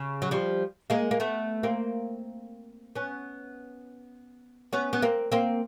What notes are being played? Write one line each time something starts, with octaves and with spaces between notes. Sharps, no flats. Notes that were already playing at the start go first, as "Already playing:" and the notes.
Already playing: C#3
F#3
F3 G3
G#3 A#3
A#3
A3 B3
A#3 C4
B3 C#4
B3 C#4
B3
A#3 C4
A#3 C4